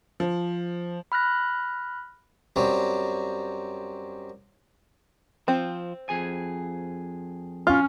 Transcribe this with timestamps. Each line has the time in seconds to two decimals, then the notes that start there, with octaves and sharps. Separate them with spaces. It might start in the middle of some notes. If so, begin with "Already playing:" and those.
0.20 F3
1.12 B5 F6 F#6 A#6
2.56 F#2 F#3 G3 C4
5.48 F3 C4
6.09 F2 G#4 G#5
7.67 C#4 F4 F6